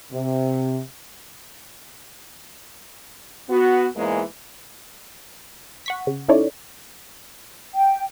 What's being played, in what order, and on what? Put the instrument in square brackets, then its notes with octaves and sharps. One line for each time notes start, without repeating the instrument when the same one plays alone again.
[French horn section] C3
B3 F#4
E2 G#2 E3 G#3 A#3
[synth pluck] F#5 C#6 B6
C#3
C#4 D#4 E4 A4 C#5 D5
[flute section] G5